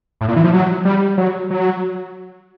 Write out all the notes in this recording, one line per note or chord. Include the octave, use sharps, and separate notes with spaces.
A2
A#2
E3
F3
F#3
G3
F#3
F#3